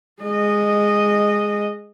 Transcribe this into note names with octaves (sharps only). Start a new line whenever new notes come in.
G#3 D#5